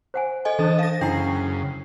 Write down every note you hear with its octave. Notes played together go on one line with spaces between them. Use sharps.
C5 F#5 G#5
A4 D#5 G#5
E3 D4 A4 C5 A5 D#6
F5 A#6
F#2 C#3 D4 E4 G5 B5 C7